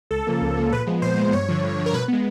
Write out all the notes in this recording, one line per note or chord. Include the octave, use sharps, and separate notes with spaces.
C#2 A4
C#3 F3 A#3
C#2
C#3 F3 A#3
A#2 B4
F3 G#3 B3
A#2 C5
F3 G#3 B3
G2 C#5
D3 F3
G2
D3 F3
A#4
B2 B4
G#3 B3